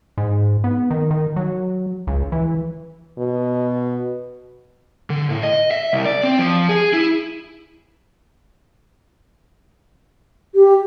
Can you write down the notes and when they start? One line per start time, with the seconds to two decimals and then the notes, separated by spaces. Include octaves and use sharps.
0.18 G#2
0.64 B3
0.91 D#3
1.11 D#3
1.36 F#3
2.07 C#2
2.32 E3
3.18 B2
5.10 D3
5.30 A2
5.43 D#5
5.71 E5
5.93 C2
6.05 D5
6.24 C4
6.39 F3
6.69 G#4
6.93 E4
10.55 G4